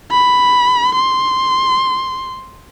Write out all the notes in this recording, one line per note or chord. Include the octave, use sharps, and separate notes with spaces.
B5
C6